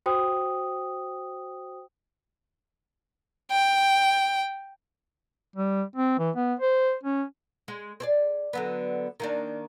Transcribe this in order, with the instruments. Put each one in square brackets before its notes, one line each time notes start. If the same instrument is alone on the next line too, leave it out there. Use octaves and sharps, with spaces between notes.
[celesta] F#4 C5 G5 D#6
[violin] G5
[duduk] G3
C4
E3
B3
C5
C#4
[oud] G#3
C4 G#4 D5
D3 F#3 B3
D#3 A#3 D4